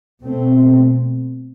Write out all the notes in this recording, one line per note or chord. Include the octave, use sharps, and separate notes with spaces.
B2 A3 C4